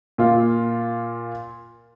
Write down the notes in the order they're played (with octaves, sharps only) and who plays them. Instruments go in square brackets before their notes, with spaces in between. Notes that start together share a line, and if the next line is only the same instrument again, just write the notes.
[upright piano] A#2 F4